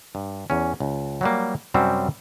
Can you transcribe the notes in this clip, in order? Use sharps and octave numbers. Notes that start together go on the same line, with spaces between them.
G2
E2 C#4
C#2
F#3 G3 A#3
F#2 C3 G3 C4 C#4 F#4